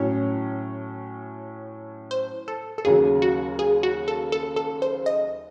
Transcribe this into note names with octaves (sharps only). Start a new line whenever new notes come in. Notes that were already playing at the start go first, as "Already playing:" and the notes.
Already playing: A2 F#3 C#4 C#5
C5
A4
A4
D#2 C#3 F#3 G#4
F#4
G#4
F#4
A4
A4
A4
C5
D#5